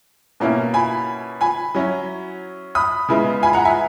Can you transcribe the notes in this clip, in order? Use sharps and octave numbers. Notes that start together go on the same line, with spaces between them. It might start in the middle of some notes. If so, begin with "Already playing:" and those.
B2 A#3 C#4 E4
G#5 B5
G#5 B5
F#3 C#4 E4
B5 D#6
C#3 G#3 B3 E4
G#5 B5
F#5 A#5
E5 G#5